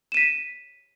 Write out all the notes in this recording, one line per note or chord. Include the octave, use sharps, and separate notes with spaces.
B6 D#7 E7